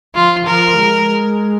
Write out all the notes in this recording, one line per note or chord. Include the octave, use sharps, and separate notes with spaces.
F3 F4
F3 A#4
G#3